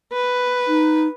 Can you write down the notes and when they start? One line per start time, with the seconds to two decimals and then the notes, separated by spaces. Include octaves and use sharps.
0.12 B4
0.68 D#4